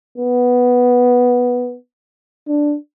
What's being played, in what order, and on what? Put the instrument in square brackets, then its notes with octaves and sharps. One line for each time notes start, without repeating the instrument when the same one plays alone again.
[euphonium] B3
D4